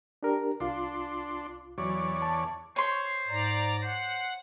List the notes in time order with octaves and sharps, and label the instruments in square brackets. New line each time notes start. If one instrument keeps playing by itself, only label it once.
[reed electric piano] D4 G4 A#4
[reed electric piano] C2 F4 [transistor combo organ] D4 C6
[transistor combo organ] E2 C#5 D5 [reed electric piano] F#3
[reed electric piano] A5
[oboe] C5 [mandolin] C#5 C6
[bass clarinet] G#2 [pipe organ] D5 A#5
[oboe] C5 [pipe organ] F#5